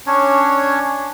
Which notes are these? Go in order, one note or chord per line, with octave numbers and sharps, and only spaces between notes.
C#4 D4 C#5